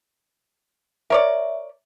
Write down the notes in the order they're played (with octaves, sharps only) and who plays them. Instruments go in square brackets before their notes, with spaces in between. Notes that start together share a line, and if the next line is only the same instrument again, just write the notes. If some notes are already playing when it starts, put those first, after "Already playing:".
[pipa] A#4 C#5 D5 [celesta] E5